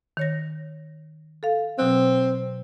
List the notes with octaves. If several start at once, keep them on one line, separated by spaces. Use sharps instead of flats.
D#3 C#5 A#6
A4 F5
B2 F#3 C4 F#6